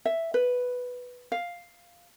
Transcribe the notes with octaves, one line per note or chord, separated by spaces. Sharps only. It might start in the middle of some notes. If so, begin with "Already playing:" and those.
E5
B4
F5